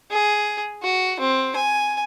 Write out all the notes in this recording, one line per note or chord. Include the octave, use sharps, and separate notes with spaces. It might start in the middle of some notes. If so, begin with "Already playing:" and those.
G#4
F#4
C4
G#5